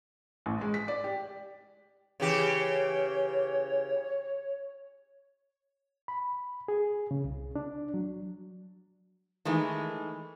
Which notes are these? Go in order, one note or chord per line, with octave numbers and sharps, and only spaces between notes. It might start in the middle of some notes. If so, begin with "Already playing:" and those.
A1
G#3
B6
D5
G4
C#3 E3 G4
C#5
B5
G#4
C#3
C2
D4
F#3
D#3 E3 G#3 A3